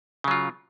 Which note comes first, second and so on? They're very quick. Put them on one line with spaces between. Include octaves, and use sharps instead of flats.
C#3 F#3 F4